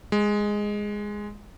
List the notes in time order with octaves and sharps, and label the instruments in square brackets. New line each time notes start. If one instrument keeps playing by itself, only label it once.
[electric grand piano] G#3